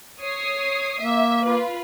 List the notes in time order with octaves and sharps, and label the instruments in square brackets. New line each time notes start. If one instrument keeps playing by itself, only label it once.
[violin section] C#5 D#6 C7
[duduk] A#3 [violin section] E5
[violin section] F4 B4